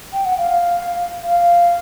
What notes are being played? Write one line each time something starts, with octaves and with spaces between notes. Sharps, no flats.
G5
F#5
F5
F5